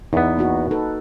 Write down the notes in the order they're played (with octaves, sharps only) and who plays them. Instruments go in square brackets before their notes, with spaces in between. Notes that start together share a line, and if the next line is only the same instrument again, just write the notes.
[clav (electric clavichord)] E2 B3 [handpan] D#4
[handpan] A#3 D#4 F#4
D#4 A4 B4